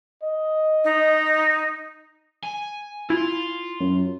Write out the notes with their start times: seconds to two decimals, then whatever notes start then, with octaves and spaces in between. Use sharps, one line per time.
0.23 D#5
0.84 D#4
2.43 G#5
3.10 E4 F4
3.80 F#2